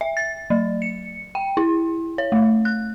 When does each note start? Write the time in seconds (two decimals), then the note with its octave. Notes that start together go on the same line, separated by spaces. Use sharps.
0.01 E5
0.17 A6
0.50 F#3
0.82 C#7
1.35 G5
1.57 E4
2.18 C#5
2.32 A3
2.65 F#6